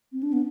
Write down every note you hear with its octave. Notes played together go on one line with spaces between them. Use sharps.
C4
D4
B3